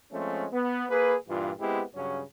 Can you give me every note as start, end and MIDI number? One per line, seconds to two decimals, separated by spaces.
0.12 0.46 53
0.12 0.46 56
0.12 0.46 57
0.12 0.46 60
0.12 0.46 61
0.52 0.84 59
0.89 1.16 58
0.89 1.16 68
0.89 1.16 71
1.29 1.51 43
1.29 1.51 46
1.29 1.51 52
1.29 1.51 65
1.60 1.82 56
1.60 1.82 59
1.60 1.82 60
1.60 1.82 64
1.60 1.82 67
1.95 2.21 43
1.95 2.21 49
1.95 2.21 54
1.95 2.21 61